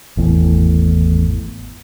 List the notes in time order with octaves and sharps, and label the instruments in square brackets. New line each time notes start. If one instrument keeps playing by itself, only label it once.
[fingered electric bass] G#1 E2 A2